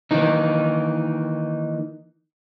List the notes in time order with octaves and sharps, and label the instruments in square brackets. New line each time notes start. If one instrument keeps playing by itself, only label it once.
[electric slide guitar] D#3 E3 A#3 D#4